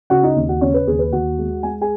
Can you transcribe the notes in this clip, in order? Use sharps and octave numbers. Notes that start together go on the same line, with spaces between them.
C#3 F#4 F#5
D#4 D#5
D#2
F#4 F#5
C#3 C#4 C#5
B4
D#2 G#4
B4
D#2 F#4 F#5
G#3
G#3 G#5
G#4 G#5